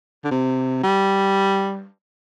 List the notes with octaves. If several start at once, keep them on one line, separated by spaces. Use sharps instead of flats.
D3
C3
G3